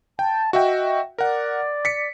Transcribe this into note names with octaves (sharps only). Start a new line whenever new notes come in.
G5 A5
F#4 D#5 E5 G5
A#4 D5 F#5
B6 C#7